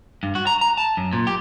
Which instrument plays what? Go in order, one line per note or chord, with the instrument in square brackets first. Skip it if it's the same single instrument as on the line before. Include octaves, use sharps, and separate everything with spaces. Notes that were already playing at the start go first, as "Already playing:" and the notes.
[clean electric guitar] G2
F#4
A#5
A#5
A5
F#2
A#2
G4